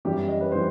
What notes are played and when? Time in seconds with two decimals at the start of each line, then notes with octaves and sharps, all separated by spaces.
0.05 F#2 E3 G3 G4
0.28 D#5
0.41 B4
0.52 E3 G3 C5